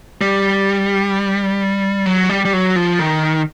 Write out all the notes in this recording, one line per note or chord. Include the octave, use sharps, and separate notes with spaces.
G3
F#3
G3
G3
F#3
F3
D#3